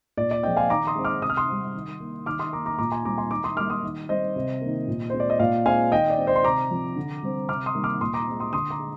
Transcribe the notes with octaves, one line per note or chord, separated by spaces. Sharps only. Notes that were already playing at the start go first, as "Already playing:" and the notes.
A#2 D5
D5
F3 G#3 C4 D#5 G5
F5 G#5
D#3 A#5 D6
C6 D#6
G#3 C4
D6 F6
C3 D#6
F6
C6 D#6
G3 C4
D#3
A#3
D#3 D6 F6
C6 D#6
A#3 A#5 D6
A#5 D6
A#2 A#5 D6
G#5 C6
G3 C4 A#5 D6
G#5 C6
D#3 A#5 D6
C6 D#6
G3 A#3 D6 F6
C6 D#6
D#3
G3 C4 C5 D#5
C3
D#3 A#3
A#2
G#3 C4 C5
D5
D#5
A#2 D5 F5
G#3 C4 F5 G#5
D#3 D#5 G5
D5
G#3 C4
C5 D#5
C6
C3 A#5 D6
F3 C4
D3
G3 C4
C3 D6 F6
C6 D#6
D#3 G3 A#3
D6 F6
A#2 C6 D#6
A#5 D6
G#3 C4
C6 D#6
D3 C6 D#6
A#5 D6
G#3